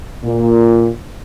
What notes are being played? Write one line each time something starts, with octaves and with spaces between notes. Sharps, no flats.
A#2